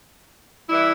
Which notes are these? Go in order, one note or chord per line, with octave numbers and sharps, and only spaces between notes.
E3 G3 E4